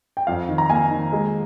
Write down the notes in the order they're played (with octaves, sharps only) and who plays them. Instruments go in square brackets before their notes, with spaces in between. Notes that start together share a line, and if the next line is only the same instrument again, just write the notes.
[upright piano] G5
[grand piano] F2 [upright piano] F5
[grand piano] D#3
[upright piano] A#5
[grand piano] A#3 [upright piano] G#5
[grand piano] D#3
G#3